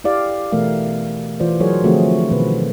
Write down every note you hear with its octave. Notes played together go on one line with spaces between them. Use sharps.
E4 G4 D5 F5
B2 E3 A3 A#4 D5 F5
E3 F4 C5 D5
F#3 F#4 G#4 A#4 C5 C#5
D3 F3 A3 C4 F#4 G#4
B2 D#3 B4